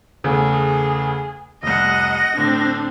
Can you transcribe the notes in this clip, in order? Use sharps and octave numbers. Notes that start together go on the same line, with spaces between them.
E2 C#3 A3 G#4
F1 C2 D#5 F#5 A#6
A2 D3 C4 D4